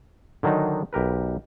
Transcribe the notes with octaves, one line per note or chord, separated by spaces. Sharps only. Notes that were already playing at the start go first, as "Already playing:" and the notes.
D3 D#3 F#3 D4 D#4
B1 G4 A#4 B4